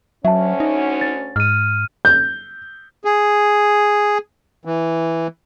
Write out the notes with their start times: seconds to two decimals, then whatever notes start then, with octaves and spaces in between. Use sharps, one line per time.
0.25 D2 F#3 C#4 E5 A5
0.60 D#4
1.01 A6
1.36 G#2 F6 D#7
2.05 G6
3.05 G#4
4.65 E3